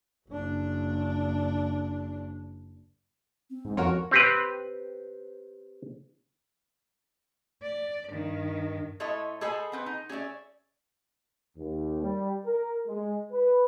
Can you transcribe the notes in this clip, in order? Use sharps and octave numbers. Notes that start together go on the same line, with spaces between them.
F#1 D4
C4
G#2
F2 F#4 A#4 C#5
C4 G4 B4
D5
G2 D#3
A2 E4 A4 C#5 D#5 C6
G#4 A4 C5 D#5 G#5 B5
B3 C4 B4
D#4
C#4 G#4 C#5 D5 E5
D#2
G3
A#4
G#3
B4